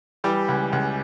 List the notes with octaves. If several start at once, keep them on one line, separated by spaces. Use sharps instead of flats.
E3 G3 G4
C#2
C#2